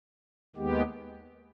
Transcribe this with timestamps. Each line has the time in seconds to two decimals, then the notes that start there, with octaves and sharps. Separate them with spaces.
0.56 D#2 D#3 G#3 B3 G4